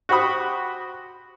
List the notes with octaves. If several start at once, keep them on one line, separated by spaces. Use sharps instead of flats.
F#4 G4 C5 B5 D#6